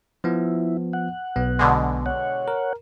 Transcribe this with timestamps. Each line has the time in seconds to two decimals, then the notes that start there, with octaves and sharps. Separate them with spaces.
0.24 F3 B3 E4
0.93 F#5
1.36 B1 B3
1.59 B2 D3 G#3
2.06 C#5 F#5
2.48 A#4